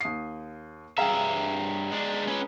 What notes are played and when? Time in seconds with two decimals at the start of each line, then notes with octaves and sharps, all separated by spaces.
0.01 D#2 D#6 C7
0.98 G2 G#4 E5 F5 G5 A#5
1.92 G#3 D4
2.28 G#3 C#4 B4